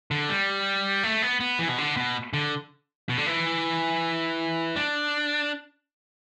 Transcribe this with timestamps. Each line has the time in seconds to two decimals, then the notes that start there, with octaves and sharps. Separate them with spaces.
0.11 D3
0.29 G3
1.03 A3
1.22 B3
1.40 B3
1.59 E3
1.68 B2
1.78 D3
1.97 B2
2.33 D3
3.09 B2
3.18 D3
3.27 E3
4.76 D4